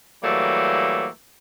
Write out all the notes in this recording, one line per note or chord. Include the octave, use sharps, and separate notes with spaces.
E3 F#3 G3 A3 A#3